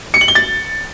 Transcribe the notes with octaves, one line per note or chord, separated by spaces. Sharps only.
C#7
F#7
G7
A6